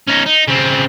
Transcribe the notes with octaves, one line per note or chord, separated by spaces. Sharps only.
C#4 D#4
D#4
C#3 C4